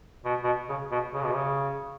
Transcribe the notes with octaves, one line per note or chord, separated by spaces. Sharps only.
B2
B2
C#3
B2
C#3
B2
C#3